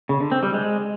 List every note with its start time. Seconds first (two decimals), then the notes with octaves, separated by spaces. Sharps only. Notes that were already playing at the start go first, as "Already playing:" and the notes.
0.09 C#3
0.20 D3
0.32 C4
0.43 G3
0.54 G#3